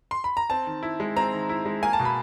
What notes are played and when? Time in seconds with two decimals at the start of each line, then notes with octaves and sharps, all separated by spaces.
0.11 C6
0.24 B5
0.37 A#5
0.50 C4 A5
0.67 D#3
0.83 E4
1.00 G#3
1.16 C4 A#5
1.33 D#3
1.49 E4
1.65 G#3
1.83 A#3 G#5
1.93 A5
1.99 B2
2.05 B5